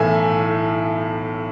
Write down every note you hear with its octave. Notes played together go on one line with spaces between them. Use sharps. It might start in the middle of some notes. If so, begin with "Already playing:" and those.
Already playing: B1 A2 E3 E5 G#5